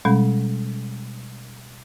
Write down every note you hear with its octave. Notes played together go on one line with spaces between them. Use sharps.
B2 G3 G#3 C#4